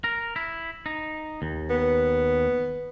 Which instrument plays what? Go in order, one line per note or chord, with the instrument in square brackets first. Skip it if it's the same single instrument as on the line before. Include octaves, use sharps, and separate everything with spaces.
[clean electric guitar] A#4
E4
D#4
D#2
[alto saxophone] B3